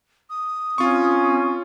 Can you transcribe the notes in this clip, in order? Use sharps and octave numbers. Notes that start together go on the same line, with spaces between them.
D#6
C4 C#4 F4 C#6